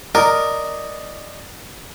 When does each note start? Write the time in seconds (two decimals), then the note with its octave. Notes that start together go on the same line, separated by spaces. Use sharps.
0.15 A#4 D5 D#5